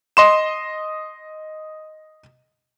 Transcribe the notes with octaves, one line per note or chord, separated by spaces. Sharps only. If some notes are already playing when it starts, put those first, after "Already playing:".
D#5 C6 E7